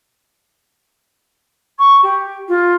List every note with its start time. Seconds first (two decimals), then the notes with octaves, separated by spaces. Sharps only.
1.79 C#6
2.03 G4
2.48 F4